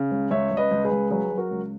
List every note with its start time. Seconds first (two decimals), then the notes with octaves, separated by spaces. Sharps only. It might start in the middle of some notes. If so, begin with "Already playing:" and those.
Already playing: C#3
0.11 C#2
0.31 C#2 C#5 E5
0.51 C#2
0.57 B4 D#5
0.71 C#2
0.85 G#4 B4
0.91 C#2
1.11 F#3 G#4 B4
1.31 F#3
1.38 F#4 A#4
1.51 C#2